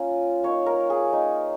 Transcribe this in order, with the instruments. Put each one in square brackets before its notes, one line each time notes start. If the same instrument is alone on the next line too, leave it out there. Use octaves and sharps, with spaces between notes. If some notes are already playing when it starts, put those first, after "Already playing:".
Already playing: [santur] A#3 C#4 F4
A#3 D#4 C#5
A#4
G#4
A#3 D#4